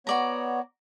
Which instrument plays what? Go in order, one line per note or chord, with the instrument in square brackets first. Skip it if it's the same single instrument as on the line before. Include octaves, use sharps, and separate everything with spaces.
[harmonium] B3 C#5 [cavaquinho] F#4 D5 A#5